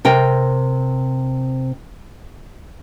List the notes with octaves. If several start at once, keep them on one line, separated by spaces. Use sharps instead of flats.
C3 A#4 G5